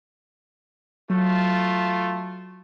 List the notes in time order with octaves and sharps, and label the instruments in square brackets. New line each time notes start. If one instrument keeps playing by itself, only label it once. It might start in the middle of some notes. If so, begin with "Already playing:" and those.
[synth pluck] F#3 [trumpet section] A3 F4